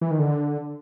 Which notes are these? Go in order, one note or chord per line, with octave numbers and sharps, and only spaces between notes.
E3
D#3
D3